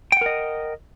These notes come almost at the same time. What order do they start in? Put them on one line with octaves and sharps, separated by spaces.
G5 F#5 A#4 D#5